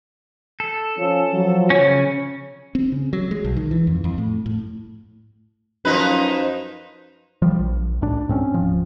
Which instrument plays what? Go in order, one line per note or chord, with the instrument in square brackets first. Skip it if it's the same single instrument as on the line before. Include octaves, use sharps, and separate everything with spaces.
[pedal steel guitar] A4
[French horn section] F3 C#4
F3 F#3
[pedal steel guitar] C#3 C#4 [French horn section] C#5
[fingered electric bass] C4
C#3
F#3
G#3
B1
D#3
E3
F2
F2
A2
A2
[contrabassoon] F#2 [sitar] F3 D#4 B4
[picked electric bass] F3 G3
A#1
C2 A2 D4
G#2 C4 C#4
D1 F3